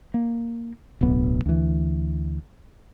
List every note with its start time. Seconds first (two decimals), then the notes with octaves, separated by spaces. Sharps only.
0.14 A#3
1.01 D1 B1 B3
1.46 D2 E3